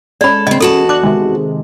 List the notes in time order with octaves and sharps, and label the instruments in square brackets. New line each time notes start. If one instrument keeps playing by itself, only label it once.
[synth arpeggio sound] G#3 C#4 [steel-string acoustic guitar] A4 [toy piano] D5 B5
[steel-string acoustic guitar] C#3 C4 [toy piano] D#5
[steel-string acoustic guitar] E2 F#4 A5 [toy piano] A4
[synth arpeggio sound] D4 F#6 [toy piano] D6
[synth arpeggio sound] C3 D#3 G#3